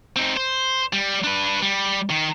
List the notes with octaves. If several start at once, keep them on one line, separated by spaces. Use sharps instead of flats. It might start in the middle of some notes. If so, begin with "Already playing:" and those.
C4 D#4
C5
G3
D4 B4
G3
D#3